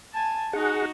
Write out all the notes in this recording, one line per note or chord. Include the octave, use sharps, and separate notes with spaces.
G#5 A5
D#4 F#4 G#4 F#5